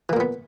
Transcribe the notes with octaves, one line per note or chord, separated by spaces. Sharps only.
A#2 E3 A#3 B3